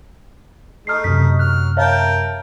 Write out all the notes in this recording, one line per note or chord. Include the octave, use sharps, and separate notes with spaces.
A3 D#4 F6 C7
F#2 C3 F6 B6
F#3 F6 F#6
A#4 C#5 E5 F5 G5 A5